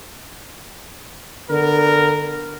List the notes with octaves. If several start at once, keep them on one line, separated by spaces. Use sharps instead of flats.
D3 B3 A#4